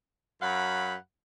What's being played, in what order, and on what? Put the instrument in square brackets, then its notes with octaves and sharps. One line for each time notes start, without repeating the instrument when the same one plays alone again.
[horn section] F#2 F#3 F5 F#5 B5